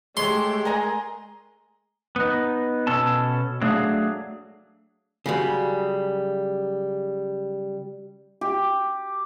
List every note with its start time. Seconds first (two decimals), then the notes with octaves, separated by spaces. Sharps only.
0.17 G#3 A3 G4 G#4 C#5 C6
0.65 G#4 A#4 G#5 A#5
2.16 B3 D#4
2.87 B2 B3 C#4 A4 A5
3.62 F#3 A3 D4 G#4 F5
5.26 C#3 F#3 G3
8.41 G4